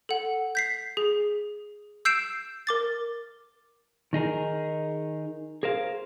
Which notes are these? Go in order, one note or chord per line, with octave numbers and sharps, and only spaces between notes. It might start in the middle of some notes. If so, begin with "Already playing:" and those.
A4 F#5
G6 B6 C7
G#4
E6 G6 C7 D7 E7
A#4 D6 A6
D#3 D#4 G#4 A#4
G#4 A#4 C5 F5